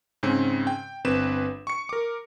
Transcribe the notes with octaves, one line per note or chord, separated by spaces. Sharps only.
G#2 C#3 C4 C#4
G5
G1 C4 B4 E7
C#6 C#7
A#4 D6